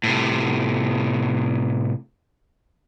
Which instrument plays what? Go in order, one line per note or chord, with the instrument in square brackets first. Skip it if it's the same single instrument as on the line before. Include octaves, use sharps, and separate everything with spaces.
[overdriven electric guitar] A2 C3